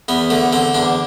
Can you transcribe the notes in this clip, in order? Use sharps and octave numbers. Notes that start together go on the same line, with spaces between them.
E2 B3
D3 A3
D3 C4
E2 D4